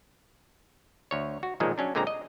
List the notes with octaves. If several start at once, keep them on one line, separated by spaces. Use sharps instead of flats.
D2 C#5
F#4
B1 A#2 D#3 F3 G#3
F#3 C#4 D4
A#2 D3 G#3 C4 A#5
D#5